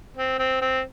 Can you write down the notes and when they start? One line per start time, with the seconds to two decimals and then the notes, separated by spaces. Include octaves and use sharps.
0.17 C4
0.39 C4
0.61 C4